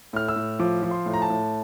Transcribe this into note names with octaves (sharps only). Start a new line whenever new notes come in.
A2 F6
E6
A2
F3 D6
F3
C6
A2
A#5
A5
A2